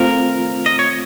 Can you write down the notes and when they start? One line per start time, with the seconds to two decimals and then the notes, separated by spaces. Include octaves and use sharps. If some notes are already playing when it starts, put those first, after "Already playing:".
Already playing: A3 C4 F4 A#4
0.66 D#5
0.79 C#5